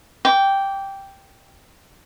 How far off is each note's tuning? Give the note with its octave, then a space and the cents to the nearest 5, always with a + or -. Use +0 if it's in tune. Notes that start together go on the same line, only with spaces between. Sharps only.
G5 +0 D6 -20